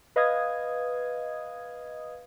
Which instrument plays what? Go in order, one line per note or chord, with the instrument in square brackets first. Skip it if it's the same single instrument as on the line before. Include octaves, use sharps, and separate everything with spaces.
[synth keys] B4 D#5 F5 D#6 G#6